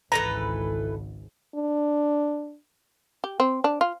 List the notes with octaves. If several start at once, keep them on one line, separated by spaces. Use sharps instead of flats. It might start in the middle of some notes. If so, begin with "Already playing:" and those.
G#1 C#2 E3 A4 B4 A#5
D4
G4
C4
D4
F4